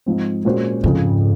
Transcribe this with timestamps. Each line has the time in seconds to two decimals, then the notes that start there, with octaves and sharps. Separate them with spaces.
0.06 G#2 F3 C4
0.45 A#2 G#3 C#4 F#4 C5
0.83 F2 G#2 C#3 F3